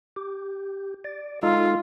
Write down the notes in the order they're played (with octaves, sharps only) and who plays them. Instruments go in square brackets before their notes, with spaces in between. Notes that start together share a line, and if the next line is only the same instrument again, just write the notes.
[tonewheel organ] G4
D5
[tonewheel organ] G#3 D#4 A4 [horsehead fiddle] F4